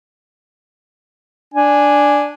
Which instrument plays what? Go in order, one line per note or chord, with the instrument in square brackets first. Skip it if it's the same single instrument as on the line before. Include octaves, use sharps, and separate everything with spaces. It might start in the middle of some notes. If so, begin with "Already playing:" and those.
[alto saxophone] D4 [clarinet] G#5